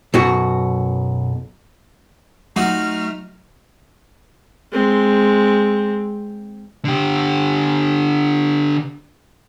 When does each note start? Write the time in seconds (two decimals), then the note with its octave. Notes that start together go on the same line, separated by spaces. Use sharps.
0.14 B1 F#2 F#4
2.56 F#3 A3 D#4 F4 F#4 C6 F6
4.73 G#3 C4
6.85 D3 G4